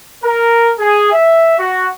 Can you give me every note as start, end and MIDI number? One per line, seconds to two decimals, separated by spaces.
0.24 0.72 70
0.79 1.12 68
1.12 1.58 76
1.58 1.88 66